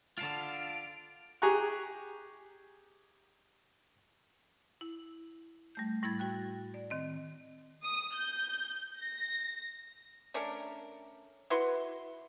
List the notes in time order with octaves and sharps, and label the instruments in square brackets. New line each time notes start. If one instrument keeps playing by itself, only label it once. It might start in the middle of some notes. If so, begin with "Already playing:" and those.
[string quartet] D3 F6 [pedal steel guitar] F4 F5 A5 [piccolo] D7
[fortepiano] G4 G#4 G#5 A#5 C#6 F#6
[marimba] E4
G3 A3 G6
A2 G3 E4 B5 G#6 A6
F#4 G5 F#6
D5
D#3 C4 D#5
[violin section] D#6
G6
A#6
[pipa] A3 C#4 D4 A#4
E4 F#4 B4 C6